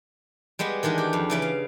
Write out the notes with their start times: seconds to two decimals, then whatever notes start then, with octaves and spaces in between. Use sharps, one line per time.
0.59 G3 G#3 B3 G4
0.83 D#3 E3 G#3 D4
0.98 G4
1.13 F2
1.30 C#3 E3 D5
1.42 F5